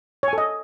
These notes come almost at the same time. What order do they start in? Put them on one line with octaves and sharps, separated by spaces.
C#5 G#5 A4 D#5